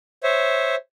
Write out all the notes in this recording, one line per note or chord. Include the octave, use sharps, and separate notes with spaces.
C5 C#5 E5